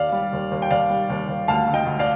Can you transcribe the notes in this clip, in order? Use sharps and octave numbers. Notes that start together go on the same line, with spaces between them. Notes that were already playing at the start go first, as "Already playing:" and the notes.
Already playing: D#2 D5 F5
G3
D#2
D#2
G5
D#2 D5 F5
G3
D#2
D#2
D2 F5 A5
D2
D#5 G5
D2
D5 F5